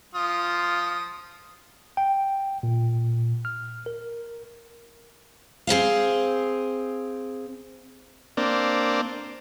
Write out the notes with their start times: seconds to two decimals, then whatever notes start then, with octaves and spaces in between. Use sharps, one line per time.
0.15 F3 F4 D#6
1.97 G5
2.63 A#2
3.45 F6
3.86 A#4
5.67 C4 G#4 C5 F5
8.37 A#3 C4 D4